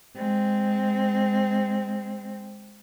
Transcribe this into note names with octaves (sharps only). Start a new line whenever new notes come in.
G#3 C4